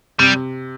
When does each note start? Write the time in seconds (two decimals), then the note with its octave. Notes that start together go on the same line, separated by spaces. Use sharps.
0.19 C3 G3